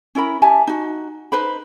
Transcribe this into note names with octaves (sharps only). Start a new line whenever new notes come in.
C#4 E4 A#4 B5
G4 E5 G#5 A5
D#4 F#4
D#4 B4 C5 B5